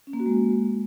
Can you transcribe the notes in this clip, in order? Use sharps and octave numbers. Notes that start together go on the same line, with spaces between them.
C#4
A#3
F#4
G#3